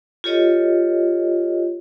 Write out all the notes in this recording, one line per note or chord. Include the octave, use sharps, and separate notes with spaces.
F4 G4 A4 C#5 D#5